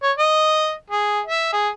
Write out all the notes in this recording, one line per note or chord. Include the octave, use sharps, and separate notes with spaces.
C#5
D#5
G#4
E5
G#4